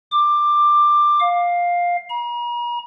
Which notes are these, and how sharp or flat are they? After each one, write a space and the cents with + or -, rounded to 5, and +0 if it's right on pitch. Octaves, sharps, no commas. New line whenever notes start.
D6 +15
F5 +10
A#5 +45